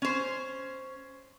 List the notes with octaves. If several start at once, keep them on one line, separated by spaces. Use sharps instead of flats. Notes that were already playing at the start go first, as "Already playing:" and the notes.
C#4 C5